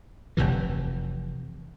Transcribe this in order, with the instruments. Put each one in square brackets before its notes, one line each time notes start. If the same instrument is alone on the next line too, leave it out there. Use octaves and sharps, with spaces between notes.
[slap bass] F1 D2 C3 E3